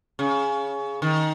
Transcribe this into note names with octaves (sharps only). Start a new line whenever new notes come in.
C#3
D#3